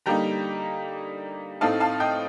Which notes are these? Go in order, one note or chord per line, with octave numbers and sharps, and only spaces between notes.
D3 G3 A#3 D#4 G5 A#5
A2 A3 C4 D#4 F5 A5
F5 A5
D#5 G5